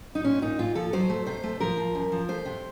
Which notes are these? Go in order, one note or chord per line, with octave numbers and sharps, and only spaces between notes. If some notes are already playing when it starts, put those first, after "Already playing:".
D#4
A#2 C#4
A#2 D#4
A#2 F4
F3 A4
F#3 C5
A3
C3 C5
A3
F3 A#4
F3
F#2
F3
A3 C5
C3